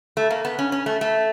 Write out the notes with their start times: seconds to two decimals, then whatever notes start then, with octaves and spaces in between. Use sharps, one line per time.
0.17 A3
0.30 A#3
0.45 B3
0.59 C#4
0.72 C#4
0.86 A3
1.01 A3